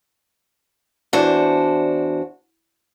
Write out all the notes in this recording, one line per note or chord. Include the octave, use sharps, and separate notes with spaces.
E2 D4 F#4 C5